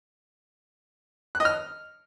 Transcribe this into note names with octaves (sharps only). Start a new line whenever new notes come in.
F#6
D#5
F6